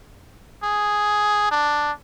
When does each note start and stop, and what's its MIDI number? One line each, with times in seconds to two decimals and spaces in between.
0.63 1.48 68
1.51 1.92 62